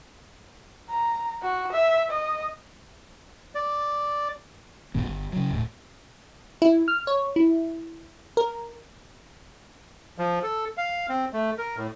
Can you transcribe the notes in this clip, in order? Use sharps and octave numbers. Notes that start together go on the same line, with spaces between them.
A#5
F#4
E5
D#5
D5
A#1 G2 D#3 B3
G1
C#3 F#3
D#1 A2
E4
F6
C#5
E4
A#4
F3
A4
F5
C4
A3
A#4
A2